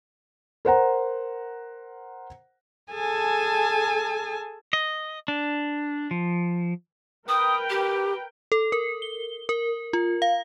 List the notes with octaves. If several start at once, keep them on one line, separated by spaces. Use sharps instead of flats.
A#4 C5 F#5 A#5
G#4 A4 G#5 A5
D#5
D4
F3
A#4 B4 G5 D#6
G4
A4
A#4
G7
A#4
F4
F5